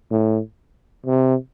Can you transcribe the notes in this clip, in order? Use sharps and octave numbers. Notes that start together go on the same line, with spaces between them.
A2
C3